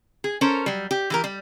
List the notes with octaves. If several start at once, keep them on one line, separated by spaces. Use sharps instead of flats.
G#4
C#4 A4 A#4 C5
F#3 G3
G4
E3 G4 A#4
G3